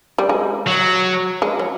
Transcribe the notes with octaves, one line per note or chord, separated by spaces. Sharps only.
G3
G#3
F#3
G#3
F#3